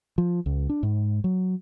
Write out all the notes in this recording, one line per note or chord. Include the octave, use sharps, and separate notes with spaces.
F3
C#2
D4
G#2
F#3